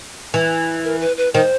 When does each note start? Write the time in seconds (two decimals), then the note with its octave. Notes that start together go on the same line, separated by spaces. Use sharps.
0.34 E3
0.84 A#4
1.01 B4
1.17 B4
1.34 D#3 C5